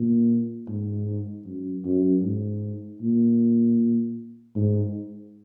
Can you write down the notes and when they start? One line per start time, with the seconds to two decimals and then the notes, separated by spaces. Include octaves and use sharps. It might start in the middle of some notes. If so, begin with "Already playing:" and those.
Already playing: A#2
0.68 G#2
1.46 F#2
1.85 F#2
2.23 G#2
3.02 A#2
4.55 G#2